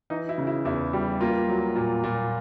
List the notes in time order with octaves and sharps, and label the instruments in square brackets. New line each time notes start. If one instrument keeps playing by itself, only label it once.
[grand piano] E3 D#4
E4
C#3
E4
E2 E4
G3
A#3 F4
F#3
A#2
A#2